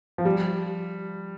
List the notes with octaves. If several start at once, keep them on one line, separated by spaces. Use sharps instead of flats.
F3
G3